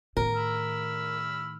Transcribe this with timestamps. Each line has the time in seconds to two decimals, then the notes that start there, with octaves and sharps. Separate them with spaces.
0.17 A2 D#3 A#4
0.36 B5 E6 F6